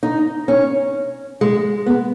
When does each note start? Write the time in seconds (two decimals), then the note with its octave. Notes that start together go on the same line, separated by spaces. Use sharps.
0.03 D#4
0.48 C#4
1.41 G#3
1.86 B3